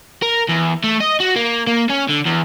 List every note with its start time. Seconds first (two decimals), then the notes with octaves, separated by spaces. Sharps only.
0.22 A#4
0.49 E2
0.84 A3
1.00 D#5
1.20 F#4
1.36 A#3
1.67 A#3
1.90 C#4
2.09 D3
2.26 E2